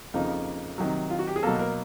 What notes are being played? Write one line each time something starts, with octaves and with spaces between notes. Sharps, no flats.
F2 C#3 F3 A#3 D#4
C3 D#3 F#3
F4
F#4
G4
G#4
B2 F#3 A#3 A4
A#4